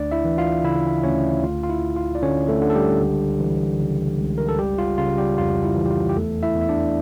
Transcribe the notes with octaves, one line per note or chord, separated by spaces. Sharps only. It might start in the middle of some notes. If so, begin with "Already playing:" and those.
Already playing: D2 D4 D5
E4 E5
E3
F4 F5
C#3 E4 E5
D2 C#4 C#5
D2 F4
F4
E4
D2
F4
D5
D3 C#4 C#5
A3 A4
D3
A4
G3 G4
C#2
E3
C#3
C#2
A#4
A4
G1 G3 G4
F4
C#3 F4
G3 G4
F2 F4
E4
E3
G4
F4
G4
E2 A3 A4
E4 E5
E2
E5
D4 D5